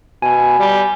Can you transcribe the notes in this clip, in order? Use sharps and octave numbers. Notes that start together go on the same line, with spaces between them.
B2 G#5
G3